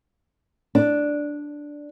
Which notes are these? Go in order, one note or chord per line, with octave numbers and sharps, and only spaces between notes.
D4